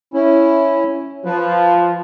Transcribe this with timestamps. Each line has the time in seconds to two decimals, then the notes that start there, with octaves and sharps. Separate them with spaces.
0.14 C#4 E4
1.25 F3 B4